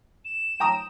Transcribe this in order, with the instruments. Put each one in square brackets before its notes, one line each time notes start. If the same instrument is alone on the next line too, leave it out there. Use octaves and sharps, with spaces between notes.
[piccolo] E7
[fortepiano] G5 A#5 D#6